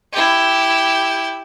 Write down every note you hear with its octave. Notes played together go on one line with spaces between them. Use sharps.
E4 G4